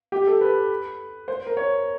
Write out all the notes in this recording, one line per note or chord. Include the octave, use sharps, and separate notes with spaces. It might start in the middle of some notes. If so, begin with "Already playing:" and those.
G4
A4
B4
C5
A#4
C#5